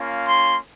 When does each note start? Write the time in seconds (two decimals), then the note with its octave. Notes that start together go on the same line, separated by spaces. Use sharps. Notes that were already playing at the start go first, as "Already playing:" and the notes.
Already playing: A#3 C#4 F4
0.27 C6